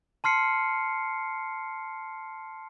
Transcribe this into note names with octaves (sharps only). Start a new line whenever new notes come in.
A5 C6 F6 C7 C#7